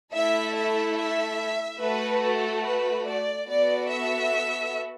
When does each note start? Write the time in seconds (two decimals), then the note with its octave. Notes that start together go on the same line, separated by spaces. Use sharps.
0.14 A3 E4 A4 E5
0.57 E5
0.99 E5
1.81 A3 F#4 A4 B4
2.23 A4
2.65 B4
3.07 D5
3.49 B3 F#4 A4 D5
3.90 E5